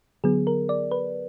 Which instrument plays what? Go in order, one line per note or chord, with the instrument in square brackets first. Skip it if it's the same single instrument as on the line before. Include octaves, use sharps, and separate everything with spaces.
[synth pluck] D3 F#3 B3 G#4
A#4
D5
B4